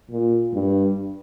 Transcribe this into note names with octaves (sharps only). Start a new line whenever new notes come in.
A#2
G2